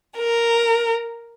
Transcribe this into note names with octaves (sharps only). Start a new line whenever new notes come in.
A#4